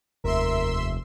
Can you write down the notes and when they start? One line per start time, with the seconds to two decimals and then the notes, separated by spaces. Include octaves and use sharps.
0.24 F1 D#2 A#4 E5 C6 E6